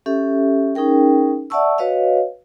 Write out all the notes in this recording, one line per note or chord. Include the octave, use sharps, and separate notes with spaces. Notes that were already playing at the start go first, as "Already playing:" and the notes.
C#4 G4 A4 E5
C#4 D#4 G#4 A#4 G5
D5 E5 F#5 A5 C#6 E6
F#4 B4 C#5 D#5 F5